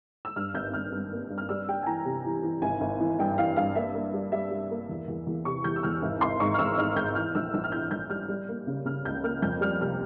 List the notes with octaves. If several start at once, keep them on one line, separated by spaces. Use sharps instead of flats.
E6
G2 F6
G#1 G6
G#1 F6
G2
A#3
G2
F6
G3 E6
G3 G5
G#5
E3 A#5
C3
E3
E3
G#1 G#5
G#1
E3
G2 G5
E3 F5
G2 F5
A#3 E5
A#3
G3
G3 E5
G3
A#3
E2
E2
E2
C3 C#6
E2 G6
E6
E2 F6
G#1
G#1 C6
G#2 C#6
F6
G#1 E6
G#2 F6
G#1 G6
E3 F6
A#1 E6
A#1 E6
F6
E3 G6
A#1 G6
G3 F6
G3
A#3
C#3
C#3 F6
C#2 G6
A#3 F6
F2 G6
G3 F6
C3 F6